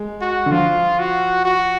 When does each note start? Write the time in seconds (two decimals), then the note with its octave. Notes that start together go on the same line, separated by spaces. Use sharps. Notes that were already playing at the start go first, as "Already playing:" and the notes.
Already playing: G#3
0.21 F#4
0.46 D3
0.51 F3 F4
0.99 F#4
1.45 F#4